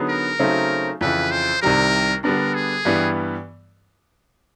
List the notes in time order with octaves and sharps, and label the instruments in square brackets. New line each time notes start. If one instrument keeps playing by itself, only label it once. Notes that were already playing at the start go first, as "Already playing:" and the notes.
Already playing: [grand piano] D3 F#3 B3 D#4 G#4
[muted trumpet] A#4
[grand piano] C#3 F#3 A3 C4 D#4
[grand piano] F2 C#3 E3 [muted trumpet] B4
[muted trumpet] C5
[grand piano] C2 C3 D#3 G3 [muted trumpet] A#4
[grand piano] D3 G3 B3 D4 [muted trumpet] A#4
[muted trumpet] G#4
[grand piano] G2 E3 G3 B3